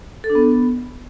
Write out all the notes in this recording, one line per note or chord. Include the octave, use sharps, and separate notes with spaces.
A4
D4
B3